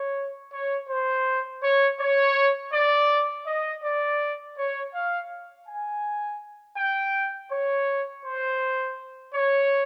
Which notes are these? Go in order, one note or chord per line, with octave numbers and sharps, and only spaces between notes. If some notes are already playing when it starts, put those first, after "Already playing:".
Already playing: C#5
C#5
C5
C#5
C#5
D5
D#5
D5
C#5
F5
G#5
G5
C#5
C5
C#5